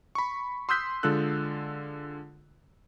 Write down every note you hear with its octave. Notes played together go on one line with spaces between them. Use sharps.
B5 C#6
C6 D#6 E6 F#6 G6 B6
D3 G#3 F4 A4 E6 F#6